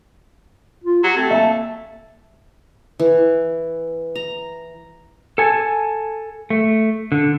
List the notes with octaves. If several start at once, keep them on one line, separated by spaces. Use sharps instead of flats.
F4
F#3 G4
A3 C4
A#3 E5 A5
E3
A#5
A4 G#5 A5
A3
D3